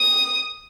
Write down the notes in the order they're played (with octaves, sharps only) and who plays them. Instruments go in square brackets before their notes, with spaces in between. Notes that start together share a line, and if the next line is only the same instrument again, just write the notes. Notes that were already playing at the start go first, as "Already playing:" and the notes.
Already playing: [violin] D#6